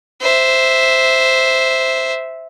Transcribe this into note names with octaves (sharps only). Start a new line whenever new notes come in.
C5 E5